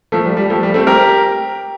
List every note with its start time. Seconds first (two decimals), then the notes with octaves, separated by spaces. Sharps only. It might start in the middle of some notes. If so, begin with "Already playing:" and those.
0.12 F3 A3
0.25 G3
0.37 G3
0.50 F3 A3
0.63 G3
0.74 A3 C4
0.87 G4 A#4